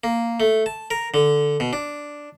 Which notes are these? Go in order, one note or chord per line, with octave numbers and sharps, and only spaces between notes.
A#3
A3
A5
A#4
D3
B2
D4